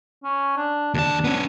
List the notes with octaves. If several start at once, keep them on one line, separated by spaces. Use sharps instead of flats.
C#4
D4
D#2 D4 A5
B3 C#4